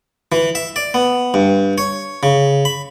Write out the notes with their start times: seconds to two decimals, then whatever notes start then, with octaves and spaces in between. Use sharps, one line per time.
0.32 E3
0.55 E5
0.76 D5
0.94 B3
1.34 G2
1.78 C#5
2.23 C#3
2.65 B5